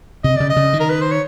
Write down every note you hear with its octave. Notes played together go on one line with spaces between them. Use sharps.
C3 D#5
C#3 D5
D#5
C#3
D#3
A#4
B4
C5
C#5